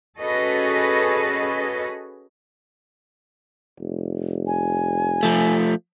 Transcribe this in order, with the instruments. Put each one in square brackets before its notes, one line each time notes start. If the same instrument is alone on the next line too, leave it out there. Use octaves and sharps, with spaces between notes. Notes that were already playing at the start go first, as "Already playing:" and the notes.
[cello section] C#4 F#4 G#4 A4 B4 D#5
[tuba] F1
[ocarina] G#5
[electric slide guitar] F3 A3